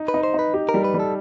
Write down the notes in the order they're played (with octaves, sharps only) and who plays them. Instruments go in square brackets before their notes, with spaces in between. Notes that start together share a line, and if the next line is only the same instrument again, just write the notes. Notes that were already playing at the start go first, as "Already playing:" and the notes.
Already playing: [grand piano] D#4
[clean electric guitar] B4
[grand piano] D#4
[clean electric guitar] C5
[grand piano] D#4 [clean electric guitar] B4
[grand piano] G4
[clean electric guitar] A#4
[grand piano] G3
[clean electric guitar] B4
[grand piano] G3
[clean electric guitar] A4